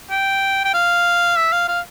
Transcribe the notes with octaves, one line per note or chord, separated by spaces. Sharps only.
G5
G5
F5
E5
F5
F5